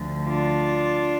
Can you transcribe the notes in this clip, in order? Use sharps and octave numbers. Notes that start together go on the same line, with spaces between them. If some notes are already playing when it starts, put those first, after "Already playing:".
Already playing: D2 D3 F3
D4 F4